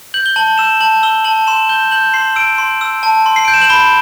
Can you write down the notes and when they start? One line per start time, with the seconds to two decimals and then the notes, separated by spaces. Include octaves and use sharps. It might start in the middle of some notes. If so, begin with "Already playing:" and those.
0.14 G6 F#7
0.26 G7
0.36 A5 F#7
0.58 E6 E7
0.81 A5 F#7
1.03 E6 G7
1.24 A5 F#7
1.47 C6 E7
1.69 G6 G7
1.91 G6 F#7
2.14 C6 C7
2.36 E6 D7
2.58 C6
2.81 E6
3.03 A5
3.26 C6
3.36 C7
3.45 G6 D7
3.54 E7
3.62 F#7
3.69 B5 G7